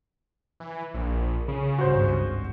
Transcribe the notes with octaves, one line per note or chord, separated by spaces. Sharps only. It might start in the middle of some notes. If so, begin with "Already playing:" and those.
E3
A#1
C#3
G#1 C#2 G2 F#4 C5